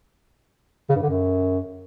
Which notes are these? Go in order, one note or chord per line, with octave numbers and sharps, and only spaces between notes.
C#3
G2
D3
F#2